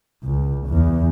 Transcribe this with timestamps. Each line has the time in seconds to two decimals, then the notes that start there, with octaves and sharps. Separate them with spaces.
0.23 C#2
0.67 E2